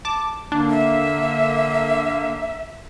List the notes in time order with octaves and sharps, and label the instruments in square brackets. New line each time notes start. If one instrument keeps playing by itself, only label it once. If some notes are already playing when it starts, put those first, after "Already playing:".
[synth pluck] A5 D6
[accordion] D3 A#3 [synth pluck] D4
[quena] E5